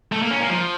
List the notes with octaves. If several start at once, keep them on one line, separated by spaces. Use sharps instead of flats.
A3
A#3
C#4
A#3
F3